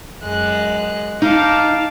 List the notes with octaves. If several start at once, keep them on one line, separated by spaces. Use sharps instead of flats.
F#2 G#3 F#6
D#4 F5 A5 D6